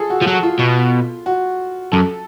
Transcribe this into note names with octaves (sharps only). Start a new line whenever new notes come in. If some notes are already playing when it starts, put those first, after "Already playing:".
Already playing: F4 G#4 A4
F#4
F3
F#3
F4
B2
F#4
F#2 A4